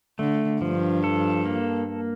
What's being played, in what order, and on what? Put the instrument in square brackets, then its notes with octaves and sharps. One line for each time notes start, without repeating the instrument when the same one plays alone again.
[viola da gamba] D3 [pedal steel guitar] A3
[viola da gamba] G2 [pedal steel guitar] F3
[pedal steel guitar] A4
A#3